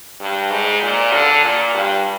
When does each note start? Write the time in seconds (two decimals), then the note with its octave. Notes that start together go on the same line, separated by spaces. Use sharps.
0.20 G2
0.51 G#2
0.82 A#2
1.13 D3
1.44 A#2
1.74 G2